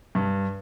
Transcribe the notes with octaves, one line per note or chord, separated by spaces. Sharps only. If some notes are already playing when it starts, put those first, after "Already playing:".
G2